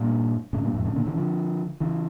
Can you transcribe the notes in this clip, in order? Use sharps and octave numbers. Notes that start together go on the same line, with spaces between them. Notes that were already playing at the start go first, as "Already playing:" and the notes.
Already playing: G2 A#2
A2 C#3
G2 A#2
F2 A2
A2 C#3
A#2 D3
C#3 E3
D3 F3
C#3 E3